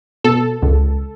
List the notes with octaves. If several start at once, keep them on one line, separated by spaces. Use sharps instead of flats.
B2 A4
C#2